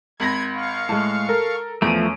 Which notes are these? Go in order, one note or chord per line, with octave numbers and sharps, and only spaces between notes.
G#1 B5 G#6 A#6
F5 C#6
A2 G#3 A5
A4 A#4
E2 F3 A3 C#4 D7 D#7